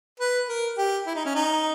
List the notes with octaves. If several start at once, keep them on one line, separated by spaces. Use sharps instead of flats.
B4
A#4
G4
E4
D#4
C#4
D#4